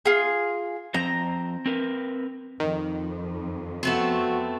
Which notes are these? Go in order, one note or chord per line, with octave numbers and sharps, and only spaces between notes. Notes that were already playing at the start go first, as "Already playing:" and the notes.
F4 G#4
F3 C4 C5 A#5
C4 A#4 B4
F2 D#3
A3 B3 C4 F#4